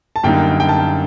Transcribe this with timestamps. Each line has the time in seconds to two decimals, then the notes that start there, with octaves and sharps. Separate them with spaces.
0.16 A5
0.24 F#2 D3 G3 A#3 D#4 G5
0.60 G5
0.69 A5
0.78 G5